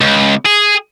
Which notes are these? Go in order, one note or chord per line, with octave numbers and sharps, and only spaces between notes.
C#2
G#4